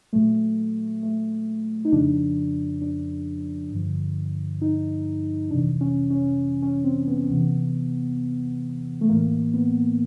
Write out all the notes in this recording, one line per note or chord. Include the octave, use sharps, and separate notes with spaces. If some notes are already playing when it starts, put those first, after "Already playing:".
A#2 F#3 A3
A3
D#4
F2 C#3 F3 D4
D4
G2 D3 F3
D#4
F2 C3 E3 D4
C#4
C#4
C#4
C4
B3
E2 C3 E3
A3
A2 E3 A#3
B3